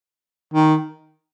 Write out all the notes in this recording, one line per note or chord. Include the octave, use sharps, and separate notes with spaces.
D#3